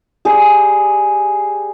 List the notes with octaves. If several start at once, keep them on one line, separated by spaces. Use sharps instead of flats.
G3 G#4 D6